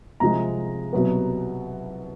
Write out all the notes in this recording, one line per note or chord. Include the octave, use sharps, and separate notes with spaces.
C2 C3 F3 G#3 A#5
C2 B2 F#3 B3